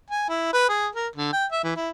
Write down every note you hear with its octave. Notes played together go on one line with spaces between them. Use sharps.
G#5
E4
B4
G#4
A#4
D3
G5
E5
E3
E4